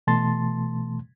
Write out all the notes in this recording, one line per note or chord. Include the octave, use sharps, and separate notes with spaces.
B2 E3 A3 A5 C6 A6